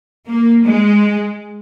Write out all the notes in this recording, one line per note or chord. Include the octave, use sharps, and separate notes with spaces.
A#3
G#3